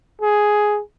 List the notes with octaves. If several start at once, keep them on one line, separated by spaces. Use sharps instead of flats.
G#4